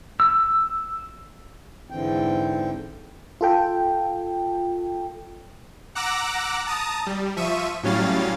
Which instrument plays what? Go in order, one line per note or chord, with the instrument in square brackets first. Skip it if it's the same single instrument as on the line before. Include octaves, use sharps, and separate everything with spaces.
[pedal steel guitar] E6
[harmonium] G#2 D3 E3 C4 G5
[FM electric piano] F4 A4 G5
[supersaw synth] F#5 A#5 D6 E6 F#6 A#6
A5 A#5 D#6
G3
F3 E5 C#6 D#7
A2 F#3 G3 C#4 F5 A6